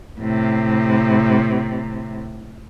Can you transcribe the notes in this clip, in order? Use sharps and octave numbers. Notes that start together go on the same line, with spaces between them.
A2 C3